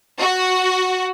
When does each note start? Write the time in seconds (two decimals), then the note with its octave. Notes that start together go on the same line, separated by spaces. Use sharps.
0.20 F#4